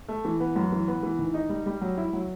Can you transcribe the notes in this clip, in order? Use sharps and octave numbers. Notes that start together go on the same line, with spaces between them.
A3
E3
B3
F#2
E3
B3
E3
D#3
D#4
G3
G3
F#3
E4
F#3